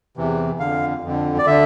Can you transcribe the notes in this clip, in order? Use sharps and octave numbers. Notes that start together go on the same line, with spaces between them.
E2 C3 E3
F2 D3 F5
F2 D3
D5
D3 E5